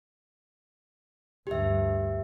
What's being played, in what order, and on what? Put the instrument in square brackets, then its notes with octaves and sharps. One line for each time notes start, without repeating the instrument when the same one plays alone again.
[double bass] D2 G2 [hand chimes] G4 E5